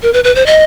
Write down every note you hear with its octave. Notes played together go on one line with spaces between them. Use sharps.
A#4
B4
B4
C5
D#5